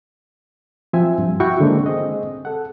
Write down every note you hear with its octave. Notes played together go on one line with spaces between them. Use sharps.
F3 C4 E5 G#5
G2
E4 F#4 G5 C#6
D3 G#3 A#3 C4 D4
C4 G#4 D#5
A4 F#5